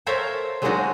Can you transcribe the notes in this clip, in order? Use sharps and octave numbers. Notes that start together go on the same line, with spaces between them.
A4 A#4 C5 C#5 E5 F5
F#3 G#3 A#3 D4 D#4 F#4